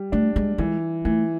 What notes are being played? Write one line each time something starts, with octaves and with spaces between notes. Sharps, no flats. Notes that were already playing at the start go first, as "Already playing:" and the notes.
Already playing: G3
A3 D4
G#3
E3 G#3
E3 A3